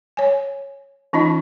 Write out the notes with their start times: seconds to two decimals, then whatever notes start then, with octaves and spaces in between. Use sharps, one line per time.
0.17 C#5 G#5
1.13 E3 C#4 D#4 F4 D#5